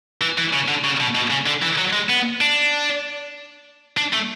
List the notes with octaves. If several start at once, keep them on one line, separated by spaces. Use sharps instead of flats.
E3
E3
C#3
D3
C#3
B2
B2
C#3
D3
E3
F#3
G#3
B3
D4
D4
A3